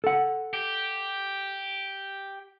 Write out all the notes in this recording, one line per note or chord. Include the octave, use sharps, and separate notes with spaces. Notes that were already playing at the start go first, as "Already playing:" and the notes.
A4 F#5
G4